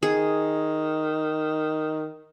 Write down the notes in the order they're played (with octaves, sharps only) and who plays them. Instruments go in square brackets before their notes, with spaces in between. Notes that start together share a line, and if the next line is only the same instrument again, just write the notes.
[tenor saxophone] D#3 [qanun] G#4